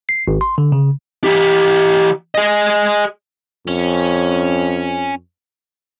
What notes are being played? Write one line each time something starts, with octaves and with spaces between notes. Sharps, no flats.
C7
G#1
C6
D3
C#3
E3 G4
G#4 D#5
F2 C#4